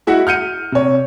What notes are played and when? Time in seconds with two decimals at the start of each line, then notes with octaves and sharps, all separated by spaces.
0.07 G#3 E4 F#4 E5 F#5
0.27 F6 G6 C#7 D#7
0.72 C3 C#5